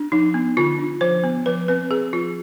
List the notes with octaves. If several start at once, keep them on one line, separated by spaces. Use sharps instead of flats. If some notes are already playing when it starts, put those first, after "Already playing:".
Already playing: D4
F3 D#4
B3
D3 F4
D4
F3 C5
B3
F3 B4
C4 B4
C4 G#4
F3 F4